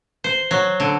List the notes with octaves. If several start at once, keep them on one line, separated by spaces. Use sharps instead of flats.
C5
F#3
D3